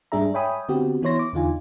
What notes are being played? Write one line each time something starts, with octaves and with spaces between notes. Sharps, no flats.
G#2 G3 D4 G#4 E5 A#5
C#5 E5 G5 G#5 B5 D#6
D3 B3 C4 F#4 G4
E3 B3 E4 C#5 C6 A#6
D6
E2 D3 D#4 F4 G#5